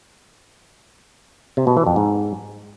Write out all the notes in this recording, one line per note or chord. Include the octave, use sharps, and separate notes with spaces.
C3
B2
E3
F2
G#2